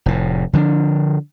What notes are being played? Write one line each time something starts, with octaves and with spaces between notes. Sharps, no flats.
F1 A2
D3 F3 G#3 D4